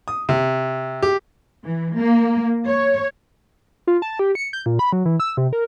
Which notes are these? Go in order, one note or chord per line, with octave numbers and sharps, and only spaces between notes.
D#6
C3
G4
E3
A#3
C#5
F4
A5
G4
C#7
G6
A#2
B5
F#3
E3
E6
C3
A#4